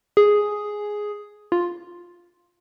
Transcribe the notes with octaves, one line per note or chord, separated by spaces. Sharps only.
G#4
F4